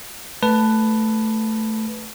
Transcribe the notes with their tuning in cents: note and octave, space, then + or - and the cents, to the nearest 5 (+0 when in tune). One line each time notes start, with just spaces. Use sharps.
A3 +0 B4 +5 A5 +0